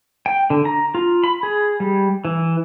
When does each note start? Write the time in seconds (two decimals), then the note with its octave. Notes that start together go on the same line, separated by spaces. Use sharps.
0.26 G5
0.50 D3
0.65 A#5
0.95 F4
1.24 B5
1.43 G#4
1.80 G3
2.25 E3